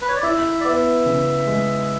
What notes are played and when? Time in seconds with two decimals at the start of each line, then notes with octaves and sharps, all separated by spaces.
0.02 B4
0.09 C#5
0.16 D5
0.23 E4 E5
0.61 D5
0.65 B3 E5
1.06 C#3
1.47 G#3